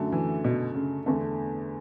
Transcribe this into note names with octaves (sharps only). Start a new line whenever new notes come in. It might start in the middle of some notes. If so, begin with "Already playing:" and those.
Already playing: F#2 D3 F#3 A3
E3
B2
C#3
E2 D3 A3